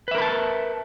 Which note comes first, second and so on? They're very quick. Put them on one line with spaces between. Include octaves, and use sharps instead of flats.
B4 E5 A#4 B5 A5